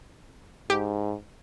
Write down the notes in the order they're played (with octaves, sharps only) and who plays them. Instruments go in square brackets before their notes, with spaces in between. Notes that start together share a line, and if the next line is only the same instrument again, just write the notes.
[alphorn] G#2 [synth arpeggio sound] G4